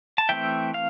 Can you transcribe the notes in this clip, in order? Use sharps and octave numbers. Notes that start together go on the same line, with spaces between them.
A5
E3 A3 C4 E5 G5
F5